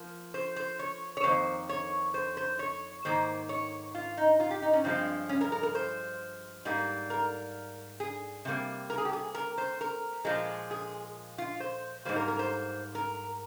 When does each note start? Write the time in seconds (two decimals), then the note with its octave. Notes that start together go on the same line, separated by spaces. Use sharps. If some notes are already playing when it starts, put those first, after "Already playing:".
Already playing: F3 A#3
0.34 C5
0.56 C5
0.79 C#5
1.17 C#5
1.24 F2 D#3 A#3 C5
1.69 C#5
2.14 C5
2.37 C5
2.59 C#5
3.05 G#2 D#3 A#3 C5
3.49 C#5
3.95 F4
4.17 D#4
4.40 F4
4.51 G4
4.62 D#4
4.73 C#4
4.84 G2 F3 G#3 C4
5.29 C#4
5.41 A#4
5.52 A#4
5.63 A#4
5.75 C5
6.65 G#2 G3 A#3
7.10 A#4
8.00 G#4
8.45 C3 G3 A#3
8.90 A#4
8.98 G#4
9.05 G4
9.13 G#4
9.35 A#4
9.58 C5
9.81 A#4
10.25 A#2 F3 G#3
10.71 G#4
11.38 F4
11.60 C5
12.05 G#2 G3 A#3 C5
12.16 A#4
12.28 A#4
12.39 C5
12.95 A#4